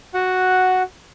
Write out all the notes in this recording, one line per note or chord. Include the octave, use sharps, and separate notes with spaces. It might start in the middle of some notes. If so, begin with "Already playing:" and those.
F#4 F#5